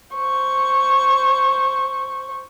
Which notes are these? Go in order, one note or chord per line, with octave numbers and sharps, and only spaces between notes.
C5 C#6